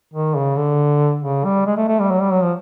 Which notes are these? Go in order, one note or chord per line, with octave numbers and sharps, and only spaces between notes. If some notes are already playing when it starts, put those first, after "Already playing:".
D#3
C#3
D3
C#3
G3
G#3
A3
A3
G3
F#3
G3
F#3
F3